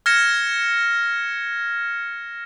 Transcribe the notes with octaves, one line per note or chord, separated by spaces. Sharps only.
F6 G#6 A#6 C#7 E7